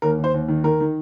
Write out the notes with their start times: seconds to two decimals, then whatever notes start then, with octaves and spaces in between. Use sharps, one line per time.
0.02 D#2 A#4
0.18 D#2
0.24 C5
0.34 D#2
0.48 D#3
0.64 D#3 A#4
0.80 D#3